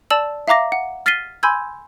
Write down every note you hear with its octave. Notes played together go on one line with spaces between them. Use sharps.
D5 A5 E6 E7 F#7
E5 F5 A#5 D6 A#6
F#5
F6 A6 B6 C7 D#7 G7
G#5 B5 C6 E6 G6 G#6